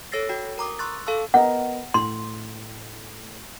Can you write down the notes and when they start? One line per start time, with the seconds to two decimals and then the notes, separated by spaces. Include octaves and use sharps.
0.12 A4 C#5 E6 A6 A#6 C7
0.29 F#4 G5
0.58 A#4 A#5 D6 D#6
0.79 C6 C#6 E6 F#6 A6
1.07 A4 F5 A5 C#6 E6
1.34 B3 A#4 D#5 F#5
1.94 A2 C6